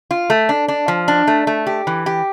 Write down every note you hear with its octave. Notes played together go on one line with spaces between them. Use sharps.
F4
A3
D4
D4
F3
D4
A3
A3
G4
E3
G4